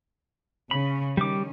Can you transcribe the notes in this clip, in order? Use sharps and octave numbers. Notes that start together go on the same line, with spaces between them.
C#3 C#4 B5
D#3 G3 C#4 D6